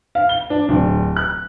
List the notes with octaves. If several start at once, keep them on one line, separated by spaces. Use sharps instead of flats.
F5
G7
D4
D1
F#6